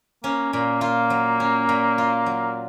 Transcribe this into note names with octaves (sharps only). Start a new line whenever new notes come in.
A#3 C#4
A#2 A#3
A#3 F4
F#3
C#4
A#2
F4
F#3